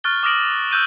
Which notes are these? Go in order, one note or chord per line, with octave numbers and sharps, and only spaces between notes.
C#6 F6 F#6 A6 G7
D6 D#6 F6 A#6 D7 F#7
E6 F#6 G6 D#7